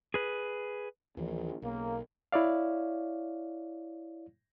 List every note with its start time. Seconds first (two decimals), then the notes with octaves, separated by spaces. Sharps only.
0.14 G#4 B4
1.17 A#1 D#2 E3 F3
1.62 B1 C#3 A#3
2.32 E4 C#5 D5 F5